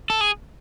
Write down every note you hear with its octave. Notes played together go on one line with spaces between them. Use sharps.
A4
G#4